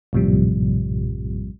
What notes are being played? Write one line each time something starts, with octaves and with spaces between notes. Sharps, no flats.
A#1 F#2 A2 C3 F3 G3